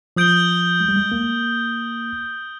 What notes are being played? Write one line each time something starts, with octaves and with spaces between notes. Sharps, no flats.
F3 D#6 G6 D7 G7
G#3
G3
G#3
A#3